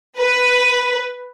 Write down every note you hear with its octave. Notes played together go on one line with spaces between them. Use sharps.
B4